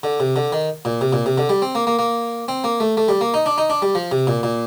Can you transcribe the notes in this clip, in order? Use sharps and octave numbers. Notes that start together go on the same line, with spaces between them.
D3
C3
D3
D#3
A#2
C3
A#2
C3
D3
G3
C4
A#3
A#3
A#3
C4
A#3
A3
A3
G3
A#3
D#4
D4
D#4
D4
G3
F3
C3
A#2
A#2